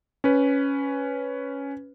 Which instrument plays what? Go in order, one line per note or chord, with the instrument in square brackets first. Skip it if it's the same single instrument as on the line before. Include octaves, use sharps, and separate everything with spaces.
[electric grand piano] C#4 B4